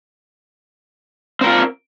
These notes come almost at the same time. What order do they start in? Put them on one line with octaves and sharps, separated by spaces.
C4 A#4 F4